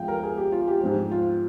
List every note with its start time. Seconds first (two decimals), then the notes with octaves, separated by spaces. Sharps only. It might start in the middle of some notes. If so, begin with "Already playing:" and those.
Already playing: G2 F3 G#3 F5 G5
0.08 A#4
0.24 G#4
0.37 G4
0.52 F4
0.68 G4
0.81 G#2 F3 C4 G4
1.11 F4